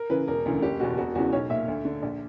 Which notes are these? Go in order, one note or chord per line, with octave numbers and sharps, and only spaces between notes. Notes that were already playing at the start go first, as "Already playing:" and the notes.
Already playing: A#4
C#3 E3 B4
E1 A#4
D2 C#3 E3
F#1 G4
E2 B2 F#4
E1 F#4
E2 C#3 E3 F#4
B1 C#5
A#2 E5
D2
D3
A#1